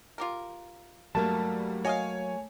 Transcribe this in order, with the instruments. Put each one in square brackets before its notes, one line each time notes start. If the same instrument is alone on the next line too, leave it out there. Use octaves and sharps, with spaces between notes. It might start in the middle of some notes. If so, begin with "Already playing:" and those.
[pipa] F4 G4 A#4
[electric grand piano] G2 G3 [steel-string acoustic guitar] F#3 A#3 [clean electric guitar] A3 A5
[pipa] F#4 D#5 F5 [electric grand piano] C#5 G#5